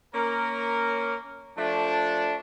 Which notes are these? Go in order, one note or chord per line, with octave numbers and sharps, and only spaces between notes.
A#3 C#4 A#4
F3 A3 D4